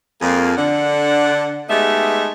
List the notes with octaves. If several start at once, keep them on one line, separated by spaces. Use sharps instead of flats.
F2 A#3 G#4
D3 D4 F#5
G#3 A3 B3 D#4 G4 E5